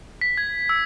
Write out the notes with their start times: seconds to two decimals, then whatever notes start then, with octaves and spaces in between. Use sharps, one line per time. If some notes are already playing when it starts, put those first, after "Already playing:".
0.21 B6
0.37 G#6
0.69 E6